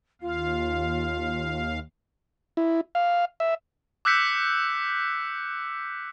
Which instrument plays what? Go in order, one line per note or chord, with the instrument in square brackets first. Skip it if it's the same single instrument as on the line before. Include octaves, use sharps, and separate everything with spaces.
[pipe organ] D#2 F5 [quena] F4
[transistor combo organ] E4
F5
E5
[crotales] D6 E6 F#6 G6 B6 C#7